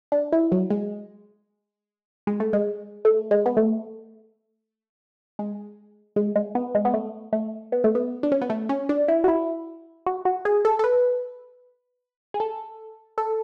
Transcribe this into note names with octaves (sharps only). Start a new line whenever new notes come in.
D4
E4
F#3
G#3
G#3
A3
G#3
A3
G#3
B3
A3
G#3
G#3
G#3
B3
G#3
B3
A3
A3
B3
A3
B3
D4
C#4
B3
A3
C#4
D4
E4
F#4
E4
F#4
F#4
G#4
A4
A4
B4
G#4
A4
A4